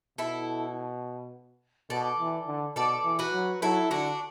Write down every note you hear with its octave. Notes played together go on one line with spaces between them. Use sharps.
B2 E4 A4
B2 A4 D5
E3
D3
B2 A4 D5
E3
F#4 B4
F#3
F#3 E4 A4
D3 D4 F#4